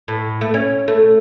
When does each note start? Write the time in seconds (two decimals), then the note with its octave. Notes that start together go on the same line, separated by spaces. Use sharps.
0.08 A2
0.41 A3
0.54 C#4
0.88 A3